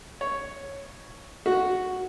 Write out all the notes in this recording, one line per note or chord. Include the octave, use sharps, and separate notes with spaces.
C#5
F#4